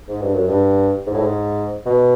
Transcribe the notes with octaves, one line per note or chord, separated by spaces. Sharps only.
G#2
G2
F#2
G2
G#2
A2
G#2
B2